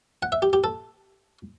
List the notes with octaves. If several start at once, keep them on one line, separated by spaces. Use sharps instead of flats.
F#5
E5
G4
G4
A4